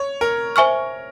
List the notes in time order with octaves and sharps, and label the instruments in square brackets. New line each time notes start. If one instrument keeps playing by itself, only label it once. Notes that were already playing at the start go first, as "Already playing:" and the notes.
Already playing: [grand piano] C#5
A#4
[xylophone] C5 E5 G#5 C#6 F6